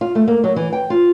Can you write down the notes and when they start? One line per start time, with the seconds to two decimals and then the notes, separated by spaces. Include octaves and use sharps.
0.01 F4
0.15 A3
0.28 A#3
0.44 F#3
0.56 E3
0.73 G5
0.90 F4